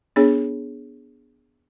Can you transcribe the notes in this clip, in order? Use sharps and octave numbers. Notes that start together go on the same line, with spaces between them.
B3 D4 G#4 C#5